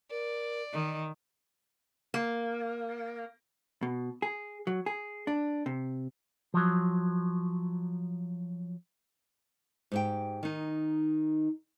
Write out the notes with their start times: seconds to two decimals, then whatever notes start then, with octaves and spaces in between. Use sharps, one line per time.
0.11 A#4 D5
0.73 D#3 D#5
2.14 A#3
3.83 B2
4.22 G#4
4.67 F#3
4.86 G#4
5.27 D4
5.66 C3
6.54 F3 F#3
9.92 G#2 G4 G5
10.43 D#3 D#4